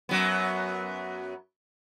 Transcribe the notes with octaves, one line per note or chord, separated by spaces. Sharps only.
F#2 F#3 B3